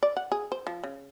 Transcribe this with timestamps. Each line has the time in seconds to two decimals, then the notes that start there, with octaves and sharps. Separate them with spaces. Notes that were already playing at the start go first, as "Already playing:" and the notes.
0.03 D5
0.17 F#5
0.32 G#4
0.52 C5
0.67 F3
0.83 C#3